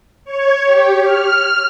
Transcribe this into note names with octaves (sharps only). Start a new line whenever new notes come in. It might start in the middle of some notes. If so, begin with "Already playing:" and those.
C#5
G4
F6